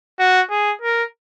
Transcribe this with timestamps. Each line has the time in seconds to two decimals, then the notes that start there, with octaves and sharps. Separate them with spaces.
0.19 F#4
0.50 G#4
0.82 A#4